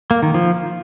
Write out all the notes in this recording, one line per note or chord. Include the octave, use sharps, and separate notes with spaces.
A#3
D#3
F3